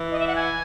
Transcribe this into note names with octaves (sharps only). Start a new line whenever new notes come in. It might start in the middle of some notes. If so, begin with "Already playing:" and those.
Already playing: E3
D#5
E5
F#5
G#5